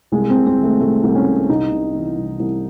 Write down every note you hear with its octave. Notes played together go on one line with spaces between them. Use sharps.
C2 G#3
C3 C4
C4
D#3 A3
C2 A3
C2
C#4
C3
C2 D#4
C3
E3
C2
C2